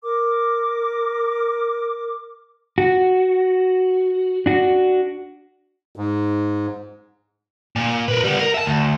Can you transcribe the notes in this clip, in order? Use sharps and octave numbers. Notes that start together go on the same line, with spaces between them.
A#4 D6
F#4
D4 F#4
G#2
A#2
A#4 B4
G3 B3
A#4
E5 A5
D2